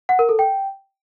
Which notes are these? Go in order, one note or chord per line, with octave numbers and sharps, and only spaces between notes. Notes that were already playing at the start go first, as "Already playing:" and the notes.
F#5
A#4
A4
G5